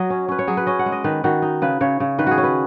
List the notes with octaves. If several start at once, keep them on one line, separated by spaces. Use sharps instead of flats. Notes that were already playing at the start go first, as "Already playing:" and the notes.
Already playing: F#3 D#5
C#4
C#4 B4
C#5
F#3 G#4
B4
C#4 D#5
F#5
G#3
D#5
D#3 B4
D#3 F#4
D#4
C#3 B4
C#3 C#5
C#3
D#3 B4
F#4 G#4
C#4
B4